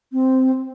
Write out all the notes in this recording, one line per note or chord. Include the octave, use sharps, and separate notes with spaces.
C4